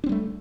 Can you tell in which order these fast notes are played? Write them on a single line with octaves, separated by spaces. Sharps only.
D4 C4 G3 A3